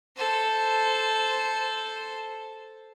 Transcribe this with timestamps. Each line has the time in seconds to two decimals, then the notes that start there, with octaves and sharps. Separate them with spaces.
0.16 A4 C5